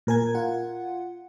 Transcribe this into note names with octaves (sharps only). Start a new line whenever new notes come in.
A#2 A#4 G#5 G#6
F4 F#5